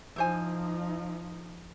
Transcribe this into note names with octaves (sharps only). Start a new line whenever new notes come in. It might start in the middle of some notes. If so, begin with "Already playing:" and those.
F3 D#4 E4 C5 G#5